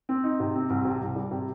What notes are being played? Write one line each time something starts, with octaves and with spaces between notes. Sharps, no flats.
C4
D#4
C3
C4
C2
C3
C2
G3
C3